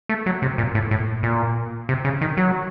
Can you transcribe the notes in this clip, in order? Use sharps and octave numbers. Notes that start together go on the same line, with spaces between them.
A3
F#3
C3
A#2
A2
A2
A#2
C3
C#3
D#3
F#3